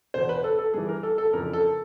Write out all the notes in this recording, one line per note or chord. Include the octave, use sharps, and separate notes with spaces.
E2 B2 C5
B4
A4
A4
G2 E3 G#4
A#4
A4
A4
F2 C#3 E3 A#4
A4